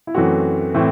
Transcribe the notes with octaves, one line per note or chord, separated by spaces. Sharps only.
E4
F#2 E3 A3 C4 F#4
A2 E3 A3 C4 E4